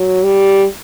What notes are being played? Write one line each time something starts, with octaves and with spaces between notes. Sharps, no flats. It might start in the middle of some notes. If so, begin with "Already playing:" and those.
Already playing: F#3
G3